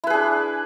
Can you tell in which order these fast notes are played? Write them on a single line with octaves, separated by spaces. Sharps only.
E4 B4 G#4 D4